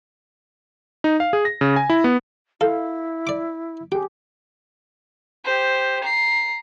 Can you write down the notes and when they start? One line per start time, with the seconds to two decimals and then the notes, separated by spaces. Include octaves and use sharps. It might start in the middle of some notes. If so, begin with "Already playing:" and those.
1.04 D#4
1.20 F5
1.33 G#4
1.45 A#6
1.61 C#3
1.76 G#5
1.90 E4
2.04 B3
2.61 E4 A4 F5
3.27 D5 D6
3.92 G4 G#4 G5
5.45 G4 C5
6.03 A#5 C7